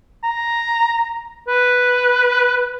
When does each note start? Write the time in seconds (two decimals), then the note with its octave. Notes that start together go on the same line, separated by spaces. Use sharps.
0.24 A#5
1.47 B4